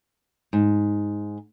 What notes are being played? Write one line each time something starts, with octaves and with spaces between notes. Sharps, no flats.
G#2